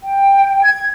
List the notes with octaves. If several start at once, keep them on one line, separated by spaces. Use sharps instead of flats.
G5
G#6